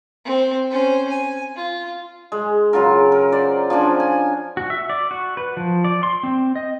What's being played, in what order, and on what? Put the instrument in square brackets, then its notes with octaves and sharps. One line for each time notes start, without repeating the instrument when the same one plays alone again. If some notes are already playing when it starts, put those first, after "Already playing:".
[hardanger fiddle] C4
C#4 C5
G#5
F4
[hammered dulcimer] G#3
C#3 F#3 F4 A#4
A#4
C5 D5
F3 C#4 D4 G#5
G#5
[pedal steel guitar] F#4
E5
D5
F#4
B4
F3
D5
C6
C4
D#5